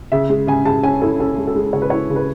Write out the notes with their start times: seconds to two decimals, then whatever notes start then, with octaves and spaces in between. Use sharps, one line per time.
0.12 C#3 E5
0.30 G#3
0.47 C#3 G#5
0.65 C#3 A5
0.83 C#4 G#5
1.02 E4 A4
1.20 C#4 A4
1.38 G#3
1.47 A4
1.56 G#3
1.73 C#3 C#5
1.82 B4
1.90 E4 C#5
2.10 C#3
2.16 B4